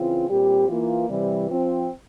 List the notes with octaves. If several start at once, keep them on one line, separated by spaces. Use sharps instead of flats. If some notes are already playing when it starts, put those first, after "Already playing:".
Already playing: C#3 E3 C4 F4
A#2 G3 C4 G4
E3 A#3 F4
C3 E3 G3
F3 C4 F4